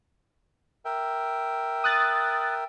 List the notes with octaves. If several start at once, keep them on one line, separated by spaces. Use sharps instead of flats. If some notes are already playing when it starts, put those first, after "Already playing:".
A#4 E5 G5
D#6 F#6 A6